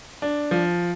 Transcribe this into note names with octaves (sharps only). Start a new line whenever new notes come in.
D4
F3